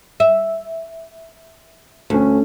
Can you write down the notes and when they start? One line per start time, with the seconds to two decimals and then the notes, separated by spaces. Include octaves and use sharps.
0.20 E5
2.10 D2 A3 C#4